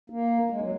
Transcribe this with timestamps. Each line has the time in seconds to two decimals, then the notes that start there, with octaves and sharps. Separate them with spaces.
0.10 A#3
0.50 G#3
0.61 F#3